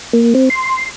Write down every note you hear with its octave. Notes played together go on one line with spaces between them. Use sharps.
A#3
C4
C6